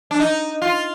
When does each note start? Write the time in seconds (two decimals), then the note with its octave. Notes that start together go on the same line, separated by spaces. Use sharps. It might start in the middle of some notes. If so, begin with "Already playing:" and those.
0.11 D4
0.20 D#4
0.62 F4